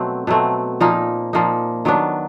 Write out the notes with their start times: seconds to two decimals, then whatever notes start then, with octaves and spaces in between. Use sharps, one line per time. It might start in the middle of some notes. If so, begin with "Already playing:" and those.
Already playing: B2 F#3 A3 C4
0.27 B2 F#3 A3 C4
0.80 A#2 F3 A#3 D#4
1.33 A#2 F3 A#3 D#4
1.85 D#3 F#3 B3 D4